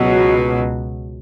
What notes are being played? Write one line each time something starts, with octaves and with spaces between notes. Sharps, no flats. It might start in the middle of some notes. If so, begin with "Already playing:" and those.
Already playing: C#2 B2 F#3